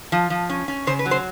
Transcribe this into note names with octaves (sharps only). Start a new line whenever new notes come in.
F3
F3
C#4
C#4
C#3 C5
B4
F#3
C5